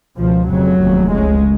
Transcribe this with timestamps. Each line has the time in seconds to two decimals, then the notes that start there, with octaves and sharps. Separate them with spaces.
0.17 C#2 B2 F3
0.49 F1 F2 C#3 F#3
0.81 F1 D#2 C#3
1.12 C#2 C#3 G#3